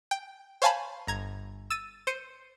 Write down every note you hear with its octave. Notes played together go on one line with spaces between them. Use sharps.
G5
C5 C#5 F5 G#5 A5 B5
G1 A#5 G#6
E6 A6 D#7
C5 C#7 D#7